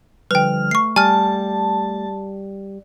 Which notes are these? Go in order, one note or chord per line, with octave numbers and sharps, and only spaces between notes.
D3 F3 G3 B4 G5 F6
A3 C#6 C7
G3 G#5 A5 F6